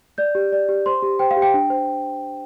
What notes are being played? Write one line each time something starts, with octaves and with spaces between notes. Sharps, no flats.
D5 G6
G4
D5
G4
C5 C6
G4
C5 G5
F5
G4
G5
D4
C5